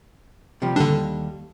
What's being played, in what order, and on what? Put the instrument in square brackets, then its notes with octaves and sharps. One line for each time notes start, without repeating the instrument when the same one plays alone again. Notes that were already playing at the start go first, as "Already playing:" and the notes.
[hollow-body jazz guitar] C3 F3 G3
[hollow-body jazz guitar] D#2 G3 A4 [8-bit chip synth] D3 D4